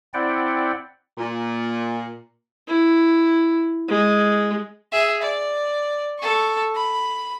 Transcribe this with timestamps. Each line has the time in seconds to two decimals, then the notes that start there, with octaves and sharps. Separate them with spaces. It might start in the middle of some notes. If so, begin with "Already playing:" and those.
0.14 C4 E4 D5 F#5 G5
1.18 A#2
2.68 E4
3.88 G#3
4.92 G#4 E5
5.22 D5
6.19 A4 C#6
6.75 B5